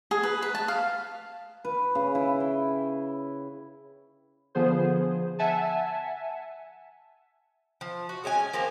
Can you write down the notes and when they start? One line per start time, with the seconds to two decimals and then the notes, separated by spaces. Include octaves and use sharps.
0.11 G#4
0.23 B4
0.42 B4
0.55 A5
0.68 F5
1.65 B4
1.95 C#3
2.15 E4
2.40 G5
4.55 D3 F3 B3 G#4 C5
5.39 E5 F#5 G#5 A5
7.81 F3
8.09 F#4
8.24 G#3 C#4 D#5 G#5
8.53 F3 A#3 C4 G4